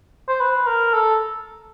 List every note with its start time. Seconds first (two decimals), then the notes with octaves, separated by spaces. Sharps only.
0.28 C5
0.40 B4
0.67 A#4
0.94 A4